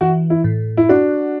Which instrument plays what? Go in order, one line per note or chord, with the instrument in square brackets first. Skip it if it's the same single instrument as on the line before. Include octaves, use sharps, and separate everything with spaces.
[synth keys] E3 [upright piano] F#4
[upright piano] E4
[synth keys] A2
[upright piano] E4
[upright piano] D4 [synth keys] F#4